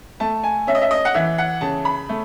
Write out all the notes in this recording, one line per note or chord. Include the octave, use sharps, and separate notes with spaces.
A3 A5
G#5
C#4 E5
D#5
E5
D#5
F#5
E3 E5
F#5
C#3 A5
B5
A3